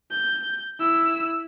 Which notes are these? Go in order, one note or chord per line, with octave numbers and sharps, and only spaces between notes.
G6
E4 E6